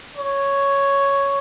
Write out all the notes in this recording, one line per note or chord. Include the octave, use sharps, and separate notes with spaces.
C#5